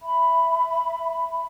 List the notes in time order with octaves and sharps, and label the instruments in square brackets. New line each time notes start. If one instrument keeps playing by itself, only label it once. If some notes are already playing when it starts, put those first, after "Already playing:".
[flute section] E5 B5